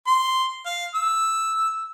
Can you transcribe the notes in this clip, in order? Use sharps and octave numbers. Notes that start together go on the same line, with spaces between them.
C6
F5
E6